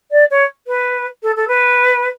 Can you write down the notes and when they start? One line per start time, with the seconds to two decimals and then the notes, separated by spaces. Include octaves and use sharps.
0.11 D5
0.31 C#5
0.67 B4
1.23 A4
1.36 A4
1.48 B4